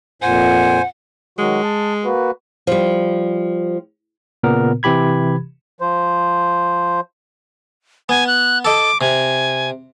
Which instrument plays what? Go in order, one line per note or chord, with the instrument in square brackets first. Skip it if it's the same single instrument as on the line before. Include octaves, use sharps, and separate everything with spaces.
[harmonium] F2 A#2 [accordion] C5 G#5 [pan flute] F#5
[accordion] D#3 F#3 F#4 [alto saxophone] G#3
[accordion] A5
A#3 F#4 B4
[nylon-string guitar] F3 G3
[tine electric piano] A#2 C#3 B3 A#4
C3 E3 G4 B5 G#6
[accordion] F3 C5
[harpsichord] B3 [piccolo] G#5
[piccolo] F#6
[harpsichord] A4 D#5 [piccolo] D6
[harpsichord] C3 [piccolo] G#5